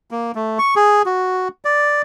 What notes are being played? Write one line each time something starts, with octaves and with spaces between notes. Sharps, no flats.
A#3
A3
C#6
G#4
F#4
D5